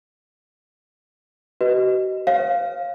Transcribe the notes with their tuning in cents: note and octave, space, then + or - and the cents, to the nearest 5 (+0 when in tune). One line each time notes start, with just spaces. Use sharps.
F#4 +40 B4 +0 D#5 +0
C#5 -30 F5 +0